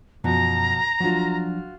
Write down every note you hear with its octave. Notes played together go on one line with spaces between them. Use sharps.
F#2 B2 F3 A#5
F3 F#3 D4 F4 F#4